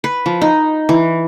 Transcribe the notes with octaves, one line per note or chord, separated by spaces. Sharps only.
B4
F3
D#4
E3